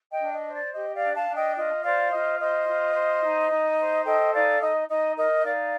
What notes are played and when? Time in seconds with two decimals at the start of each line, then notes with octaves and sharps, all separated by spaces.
0.11 D#5 G5
0.18 D4
0.31 D#5
0.45 C5
0.53 D5
0.73 G4 D#5
0.94 D5 F5
1.01 D4
1.14 F5 A5
1.28 D4
1.35 D#5 G5
1.56 F4 D#5
1.83 C5 D5 F5
2.11 F4 D#5
2.39 C5 D#5
2.66 F4
2.94 C5
3.22 D#4
3.50 D#4
3.77 C5
4.05 A4 D#5 G5
4.33 D#4 D5 F5
4.60 D#4 D#5
4.88 D#4 D#5
5.16 A#4 D#5
5.43 D#4 D5 F5